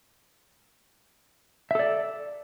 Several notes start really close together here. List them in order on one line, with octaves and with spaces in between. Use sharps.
E5 A4 D5